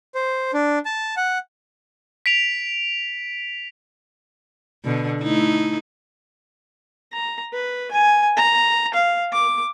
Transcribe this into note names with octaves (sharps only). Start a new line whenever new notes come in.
C5
D4
A5
F#5
B6 D7 F7
B2 D3
A3 D#4 E4
A#5
B4
G#5
A#5
F5
D6